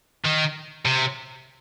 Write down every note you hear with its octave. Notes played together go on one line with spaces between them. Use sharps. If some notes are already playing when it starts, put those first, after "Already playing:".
D#3
C3